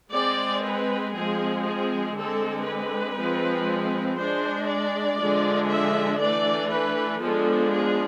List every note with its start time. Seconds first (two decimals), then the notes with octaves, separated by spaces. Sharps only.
0.14 G#3 C4 D5
0.65 B4
1.15 F3 G#3 C4 G#4
1.65 G#4
2.16 D3 G#3 C4 A4
2.66 B4
3.17 F3 G#3 C4
4.18 G#3 D4 C5
4.69 D5
5.20 D3 F3 G#3 D4
5.70 E5
6.20 E3 A3 D4 D5
6.71 B4
7.21 F3 G#3 B3 D4 A4
7.73 G#4